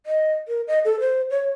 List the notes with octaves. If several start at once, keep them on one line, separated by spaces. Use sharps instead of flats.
D#5
A#4
D#5
A4
C5
C#5